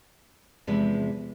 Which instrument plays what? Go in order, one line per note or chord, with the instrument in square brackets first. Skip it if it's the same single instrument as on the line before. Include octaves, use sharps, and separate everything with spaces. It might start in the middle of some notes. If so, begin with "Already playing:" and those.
[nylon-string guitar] E2 C3 F3 G#3 B4